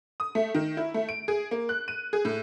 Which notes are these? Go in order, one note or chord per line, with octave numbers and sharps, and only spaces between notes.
D#6
A3
D#3
E4
A3
D7
G#4
A#3
F#6
D#7
G#4
A2